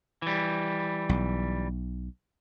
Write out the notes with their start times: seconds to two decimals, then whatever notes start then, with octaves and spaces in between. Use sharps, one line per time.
0.22 E3 G3
1.09 B1